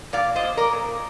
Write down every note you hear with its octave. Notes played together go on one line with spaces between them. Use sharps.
A#2 D5 F5
C5 D#5
A#2
A#4 D5
A#2